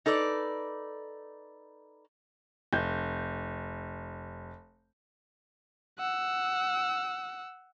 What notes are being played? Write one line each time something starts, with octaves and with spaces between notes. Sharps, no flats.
D#4 A4 B4 D5
F1 G6
F#5 E6